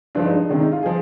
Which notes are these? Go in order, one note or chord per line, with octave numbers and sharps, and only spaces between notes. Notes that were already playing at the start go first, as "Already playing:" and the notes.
G2 F3 G#3 D4
D#4
D4
C3 D#3 G#3 D4
D#4
F4
F3 G#4